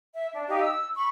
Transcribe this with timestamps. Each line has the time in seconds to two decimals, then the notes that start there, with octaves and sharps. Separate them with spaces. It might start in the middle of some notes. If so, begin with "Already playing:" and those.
0.15 E5
0.32 D4
0.47 D#4 G4 D#5 F5
0.59 E6
0.95 B5 C#6